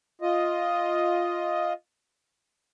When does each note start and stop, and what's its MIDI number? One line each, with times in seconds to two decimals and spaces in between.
0.22 1.73 65
0.22 1.73 75